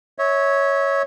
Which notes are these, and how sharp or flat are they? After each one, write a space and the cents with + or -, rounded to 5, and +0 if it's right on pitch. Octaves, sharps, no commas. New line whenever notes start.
C#5 +0 E5 -30